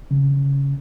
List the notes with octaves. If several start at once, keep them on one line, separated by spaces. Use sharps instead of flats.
C#3